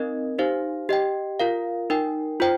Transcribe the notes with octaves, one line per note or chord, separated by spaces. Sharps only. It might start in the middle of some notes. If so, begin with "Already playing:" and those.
Already playing: C4 D#4 A#4 D#5
D#4 G4 C5 F5
G4 D#5 G5
F4 A#4 F5
D#4 A#4 G5
F4 C5 G5